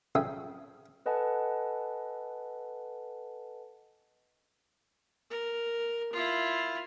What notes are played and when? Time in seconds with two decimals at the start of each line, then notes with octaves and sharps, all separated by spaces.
0.15 F2 C#3 F#3 G#4 E5 G5
1.06 A4 B4 D#5 F#5 G#5 A5
5.30 A#4
6.12 E4 F4